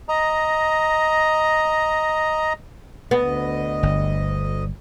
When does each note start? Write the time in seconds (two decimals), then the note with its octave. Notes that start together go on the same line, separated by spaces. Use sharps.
0.09 D#5 A#5
3.11 D2 B3 D#5
3.83 G1